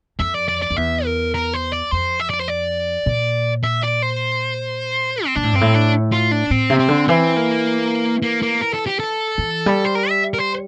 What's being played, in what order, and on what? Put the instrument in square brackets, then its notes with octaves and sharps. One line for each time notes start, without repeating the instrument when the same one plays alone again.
[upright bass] F2 [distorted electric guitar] E5
[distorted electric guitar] D5
D5
D5
[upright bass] F2
[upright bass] E2 [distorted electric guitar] E5
[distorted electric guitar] A#4
A#4
C5
D5
[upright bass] F2 [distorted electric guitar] C5
[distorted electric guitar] E5
D5
C5
D5
[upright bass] A#2
[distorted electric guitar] E5
D5
C5
C4
[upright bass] A#2 [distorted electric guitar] D4
[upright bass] A2
[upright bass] G2 [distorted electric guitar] C4
[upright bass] A2
[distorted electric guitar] D4
F4
D4
[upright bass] A2 [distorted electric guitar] C4
[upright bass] C3
[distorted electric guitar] C4
[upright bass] D3
[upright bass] E3 [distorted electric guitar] C4
[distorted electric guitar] A#3
A#3
A#3
A#4
A4
G4
A4
[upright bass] E3
G3
[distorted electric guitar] C5
A#4
E5
A#4
C5